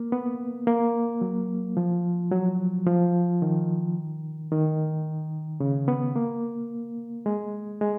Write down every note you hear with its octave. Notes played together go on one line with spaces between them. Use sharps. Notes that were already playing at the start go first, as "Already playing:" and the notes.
Already playing: A#3
B3
A#3
F#3
F3
F#3
F3
D#3
D#3
C#3
B3
A#3
G#3
G#3